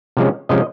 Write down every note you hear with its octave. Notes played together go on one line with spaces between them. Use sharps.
C3 F3 G#3 C#4
C3 F3 G#3 C#4 D#5